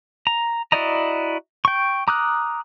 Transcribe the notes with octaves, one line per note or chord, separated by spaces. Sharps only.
A#5
E4 F#4 D5 D#5 A#5
G5 C#6
A#5 D6 D#6 F6 F#6